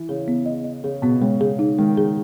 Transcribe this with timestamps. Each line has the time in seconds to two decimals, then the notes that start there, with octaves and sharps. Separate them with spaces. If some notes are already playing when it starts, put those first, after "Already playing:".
Already playing: E3
0.09 C#3 G#4
0.28 B3
0.46 D#5
0.64 D#5
0.84 C#3 G#4
1.02 B2 B3
1.21 C#3 G#3
1.40 C#3 G#4
1.59 D#4
1.78 D#3 G#3
1.97 G#4